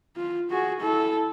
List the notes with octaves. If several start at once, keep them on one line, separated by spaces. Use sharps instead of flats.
F4
F#4 G#4
E4 A4